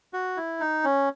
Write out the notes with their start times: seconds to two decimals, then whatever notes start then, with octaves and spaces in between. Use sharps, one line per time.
0.13 F#4
0.37 E4
0.60 D#4
0.84 C#4